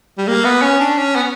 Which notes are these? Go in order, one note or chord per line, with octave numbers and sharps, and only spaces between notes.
G3
A#3
B3
C#4
D4
C#4
B3